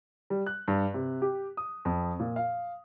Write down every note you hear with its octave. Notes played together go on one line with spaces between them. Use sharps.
G3
F#6
G2
C3
G4
D#6
F2
A#2
F5